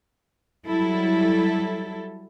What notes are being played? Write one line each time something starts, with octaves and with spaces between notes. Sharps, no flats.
F#3 G3 E4 A4